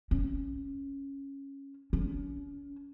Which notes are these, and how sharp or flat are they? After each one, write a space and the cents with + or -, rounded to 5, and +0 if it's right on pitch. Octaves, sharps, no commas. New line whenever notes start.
C#4 -5
C#4 +35